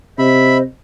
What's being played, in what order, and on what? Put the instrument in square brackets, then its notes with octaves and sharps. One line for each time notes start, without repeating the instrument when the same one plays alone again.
[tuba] C3 [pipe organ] C5 D#5 [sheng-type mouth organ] E5 B5